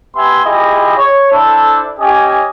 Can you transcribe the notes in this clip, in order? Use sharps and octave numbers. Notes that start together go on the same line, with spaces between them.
B3 G4 E5 G#5 C6
E4 F4 G4 G#4 D#5
C#5
D4 E4 A4 C5 D5
C#4 G4 D#5 G#5